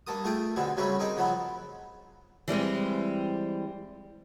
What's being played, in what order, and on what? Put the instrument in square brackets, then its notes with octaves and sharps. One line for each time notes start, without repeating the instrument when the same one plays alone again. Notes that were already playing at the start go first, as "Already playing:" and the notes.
[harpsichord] G2 A#3 A4 D#6
A3 F4 G#4 G5
B2 D3 C4 G#4
C#3 F#3 G3 A3 C4 C#4
C4 D#4 G#4 A#4
C#3 F3 F#3 B3
[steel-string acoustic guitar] E3 G3 G#3 C4